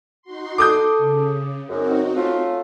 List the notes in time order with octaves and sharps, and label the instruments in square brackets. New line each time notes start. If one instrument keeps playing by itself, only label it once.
[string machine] D#4 F#4 C6
[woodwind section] A4 [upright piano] D6 D#6 G6
[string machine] C#3
[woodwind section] F#2 [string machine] C4 D#4 F#4
[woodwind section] A3 C#4 F4